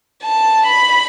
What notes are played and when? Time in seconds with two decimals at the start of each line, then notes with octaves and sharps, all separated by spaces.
0.23 A5
0.66 B5